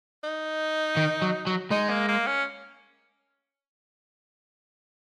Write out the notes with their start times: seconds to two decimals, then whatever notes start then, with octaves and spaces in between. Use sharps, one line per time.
0.24 D#4
0.97 D#3
1.22 F#3
1.47 F#3
1.71 G#3 D#4
1.90 A#3
2.08 A#3
2.27 C#4